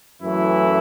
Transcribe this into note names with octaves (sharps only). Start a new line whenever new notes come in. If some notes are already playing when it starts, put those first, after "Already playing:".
F#2 E3 A3 E4